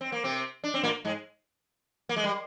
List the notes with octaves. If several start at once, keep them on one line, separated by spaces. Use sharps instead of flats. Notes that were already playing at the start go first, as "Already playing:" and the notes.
C4
A#3
C3 C4
D4
C4
A#2 A#3
G#2 G#3
A#3
G#3
G3